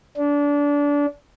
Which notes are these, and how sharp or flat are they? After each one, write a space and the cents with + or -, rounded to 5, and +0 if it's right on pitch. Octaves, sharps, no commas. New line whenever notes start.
D4 -25